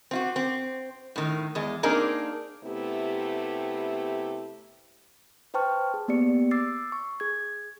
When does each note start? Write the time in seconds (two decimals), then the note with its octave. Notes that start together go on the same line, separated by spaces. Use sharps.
0.11 C4 F4 F#4
0.36 C4
1.16 A2 D#3
1.55 E2 G#3
1.83 A#3 C4 D4 D#4 G#4 A#4
2.64 C3 A3 B3 E4 G4
5.54 B4 C5 G5 A5 C#6 F6
5.94 G#4
6.08 A#3 B3 G4 D5 C#7
6.51 D6 E6 A6 C7
6.92 C#6
7.20 G#4 G#6